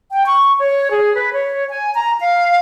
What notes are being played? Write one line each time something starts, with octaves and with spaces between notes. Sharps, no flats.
G5
C#6
C#5
G#4
B4
C#5
G#5
A#5
F5